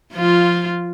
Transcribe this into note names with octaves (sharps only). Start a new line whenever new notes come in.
F3 F4